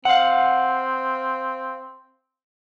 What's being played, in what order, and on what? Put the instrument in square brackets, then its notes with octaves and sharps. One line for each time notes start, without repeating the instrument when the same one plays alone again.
[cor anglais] C4 [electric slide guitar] F5 F#5